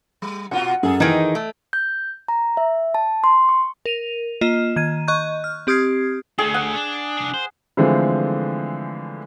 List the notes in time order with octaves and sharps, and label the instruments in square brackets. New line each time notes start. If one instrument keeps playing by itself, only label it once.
[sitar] G3
[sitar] B2 F4 F#4 [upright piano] F#5
[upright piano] F#2 [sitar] G#4 A4
[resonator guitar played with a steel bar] D#3 D#4 [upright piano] E3 G#6 D7
[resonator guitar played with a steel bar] A3
[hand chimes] G6
A#5
E5
A5
C6
C#6
[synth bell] A#4 D#7 F7
A#3 F4 D#5 A#5 E7
D#3 G#6 D#7
D#5 C#6 F#6 G6
F6
C4 G4 D#6 F6 G#6 C7
[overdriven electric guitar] A3 D4 [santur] G#4
[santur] F#5
[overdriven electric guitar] D4
C2 D4
C5
[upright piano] D3 E3 F3 G#3 A3 C4